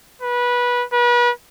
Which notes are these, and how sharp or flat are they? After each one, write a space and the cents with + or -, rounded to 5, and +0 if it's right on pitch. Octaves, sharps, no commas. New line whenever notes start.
B4 -20
B4 -35